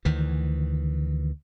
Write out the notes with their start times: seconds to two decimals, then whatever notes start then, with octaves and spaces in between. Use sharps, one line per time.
0.05 D2 D#3 E3